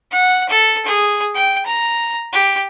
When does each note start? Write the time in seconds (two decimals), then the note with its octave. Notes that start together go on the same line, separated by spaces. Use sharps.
0.11 F#5
0.49 A4
0.86 G#4
1.35 G5
1.66 A#5
2.33 G4